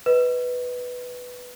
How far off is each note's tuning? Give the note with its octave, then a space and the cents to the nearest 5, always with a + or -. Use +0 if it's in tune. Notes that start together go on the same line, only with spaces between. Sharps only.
B4 +0 D#5 +15